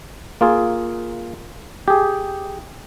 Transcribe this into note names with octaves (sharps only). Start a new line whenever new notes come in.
A#3 F4 G#4
G4 G#4